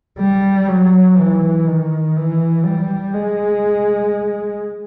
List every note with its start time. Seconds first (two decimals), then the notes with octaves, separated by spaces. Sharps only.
0.20 G3
0.68 F#3
1.18 E3
1.67 D#3
2.17 E3
2.65 G3
3.14 G#3